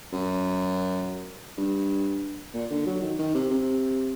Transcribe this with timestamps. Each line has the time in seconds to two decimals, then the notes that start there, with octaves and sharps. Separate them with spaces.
0.12 F#2
1.57 G2
2.54 A#2
2.71 D3
2.86 F#3
3.02 D#3
3.19 D#3
3.35 C3
3.51 C3